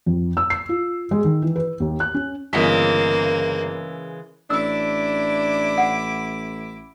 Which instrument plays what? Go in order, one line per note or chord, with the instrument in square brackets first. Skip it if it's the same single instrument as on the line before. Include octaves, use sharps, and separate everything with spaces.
[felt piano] F2
E6
C7
F4
G#3
D#3
E3
B4
D#2
F#6
C#4
[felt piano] G1 B6 [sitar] C#3 E3 G#3 [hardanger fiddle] A#3
[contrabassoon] A1 [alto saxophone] D4 [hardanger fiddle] E4 D6 [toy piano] E6
[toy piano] F#5